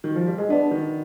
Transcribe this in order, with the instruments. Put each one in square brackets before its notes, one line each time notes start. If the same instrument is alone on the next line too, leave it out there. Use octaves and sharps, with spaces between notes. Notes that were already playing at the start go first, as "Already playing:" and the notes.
[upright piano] D#3
F3
G3
G#3
[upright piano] B3 [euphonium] D4
[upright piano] D#3